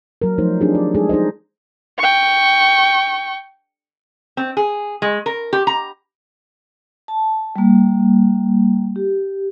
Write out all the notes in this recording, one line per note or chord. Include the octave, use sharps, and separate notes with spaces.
F#3 A#4
F3 A3 D#4 C5
C4 D4 D#4 F4 G4 G#4
D5
G#3 D#4 G#4 A4
D#4 G#4 C5 D#5
G5 C#6
C4
G#4
G#3
A#4
G4
A#5
A5
G3 A#3
G4